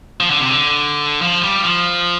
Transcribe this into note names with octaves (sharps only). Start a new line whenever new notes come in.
F3
D3
C3
D3
F3
G3
F3